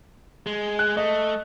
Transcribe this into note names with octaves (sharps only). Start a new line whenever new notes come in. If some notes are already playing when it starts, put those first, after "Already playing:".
G#3
F#6
A3 D#5